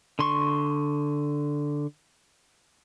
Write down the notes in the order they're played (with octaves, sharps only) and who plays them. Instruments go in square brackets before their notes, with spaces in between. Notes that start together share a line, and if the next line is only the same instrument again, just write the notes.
[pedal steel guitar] D3 C6 C#6